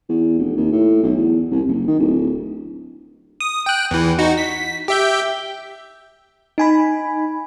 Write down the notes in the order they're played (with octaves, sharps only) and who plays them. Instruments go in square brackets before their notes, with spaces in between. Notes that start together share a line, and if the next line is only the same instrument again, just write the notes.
[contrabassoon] E2
F1
D#2
A2
B1
E2
C2
F#1
D#3
D1
[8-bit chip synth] D#6
G5 F#6
E2 E3
D#4 F#4
B6
G4 E5 G6
[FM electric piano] D#4 G#5 B5